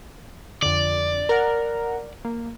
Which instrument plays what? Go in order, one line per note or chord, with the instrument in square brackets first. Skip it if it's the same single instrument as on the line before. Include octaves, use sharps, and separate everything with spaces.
[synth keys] F2 D3 [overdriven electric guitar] D5
[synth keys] A#4 F#5
A#3